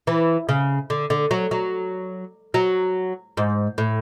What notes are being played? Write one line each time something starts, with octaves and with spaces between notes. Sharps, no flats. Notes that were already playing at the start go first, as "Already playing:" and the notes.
E3
C#3
D3
D3
F#3
F#3
F#3
G#2
A2